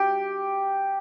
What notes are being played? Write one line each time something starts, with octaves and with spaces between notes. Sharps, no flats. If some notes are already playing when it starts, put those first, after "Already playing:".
Already playing: G4